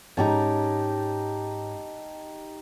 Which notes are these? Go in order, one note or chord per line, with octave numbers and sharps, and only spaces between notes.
G#2 C#4 D#4 G4 A5 A#5